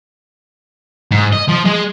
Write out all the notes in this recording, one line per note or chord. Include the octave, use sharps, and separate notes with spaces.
G#2
D#5
F3
G#3